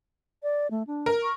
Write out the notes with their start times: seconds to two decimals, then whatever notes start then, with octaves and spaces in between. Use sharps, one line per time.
0.43 D5
0.71 A3
0.87 D4
1.06 A#4
1.23 C#6